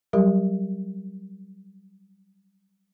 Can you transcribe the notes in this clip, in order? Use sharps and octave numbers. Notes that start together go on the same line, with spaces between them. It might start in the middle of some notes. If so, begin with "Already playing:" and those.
F#3 G3 G4 A#4